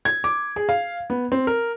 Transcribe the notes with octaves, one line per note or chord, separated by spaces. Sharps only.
G#6
D6
G#4
F5
B3
C4
A#4